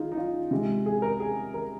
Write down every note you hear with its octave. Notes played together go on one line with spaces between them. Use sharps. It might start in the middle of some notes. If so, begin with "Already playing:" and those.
Already playing: D#3 D#4 F4 G#4
D#4
F4
C3 G#3
G#4
A#4
G#4
A#4